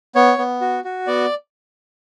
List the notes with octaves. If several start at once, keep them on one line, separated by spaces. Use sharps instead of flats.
B3 C#5
B3
F#4
F#4
B3 D5